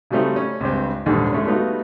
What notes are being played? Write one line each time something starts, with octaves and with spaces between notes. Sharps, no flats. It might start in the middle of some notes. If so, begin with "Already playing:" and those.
C#3 F#3 G3 A3 C4 D#4
C#4
C#2 G2 C4
A#1 D#2 G#2 D3 D#3 G3
G#3 A3 C#4
G3 A3 B3 D#4 F4 F#4